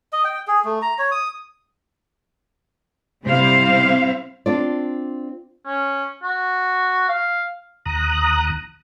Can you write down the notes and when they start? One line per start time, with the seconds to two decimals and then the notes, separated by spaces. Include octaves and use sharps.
0.13 D#5
0.24 G5
0.48 G#4
0.65 A3
0.82 A#5
0.99 C#5
1.12 D#6
3.26 C3 G3 C4 E4 C5 F5
4.46 C4 D4 F4 D5
5.67 C#4
6.23 F#4
7.09 F5
7.86 D#2 A#5 D#6 F#6